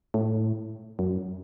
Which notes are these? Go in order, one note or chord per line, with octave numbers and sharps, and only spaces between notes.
A2
F#2